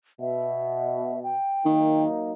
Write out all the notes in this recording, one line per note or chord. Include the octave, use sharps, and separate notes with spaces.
B2 E5
G5
D#3 F#3 A#3 D#4